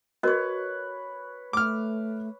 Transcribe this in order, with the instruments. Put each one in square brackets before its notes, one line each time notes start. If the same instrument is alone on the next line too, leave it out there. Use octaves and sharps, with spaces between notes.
[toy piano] F#4 A#4 D#5 [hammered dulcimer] B4 C#5
[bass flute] A3 [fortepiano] D6 F6